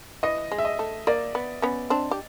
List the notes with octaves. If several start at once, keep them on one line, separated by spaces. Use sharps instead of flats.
E3 D#5
G#3
E5
D#5
A3
A#3 D5
B3
B3 C#4
C4 D4
G4